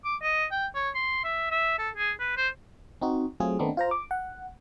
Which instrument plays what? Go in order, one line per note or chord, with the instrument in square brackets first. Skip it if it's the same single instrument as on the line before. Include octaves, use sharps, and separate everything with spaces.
[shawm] D6
D#5
G5
C#5
C6
E5
E5
A4
G#4
B4
C5
[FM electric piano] C4 D#4 F#4
F#3 A3 C4 F4 G#4
D#3 A3 B3 C4 D4 D#4
F4 C5 A#5
D6
F#5